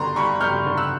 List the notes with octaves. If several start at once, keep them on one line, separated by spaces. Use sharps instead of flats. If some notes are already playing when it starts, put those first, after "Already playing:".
Already playing: G1 D3 A#5 C6
G2 B5 C#6
G1 F6 G6
D3
E6 F#6